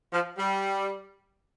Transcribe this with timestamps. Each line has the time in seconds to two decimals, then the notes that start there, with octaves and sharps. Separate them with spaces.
0.12 F3
0.38 G3